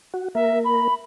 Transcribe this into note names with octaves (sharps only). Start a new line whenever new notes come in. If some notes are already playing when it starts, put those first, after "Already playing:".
F#4
A#3 A#4 E5
B5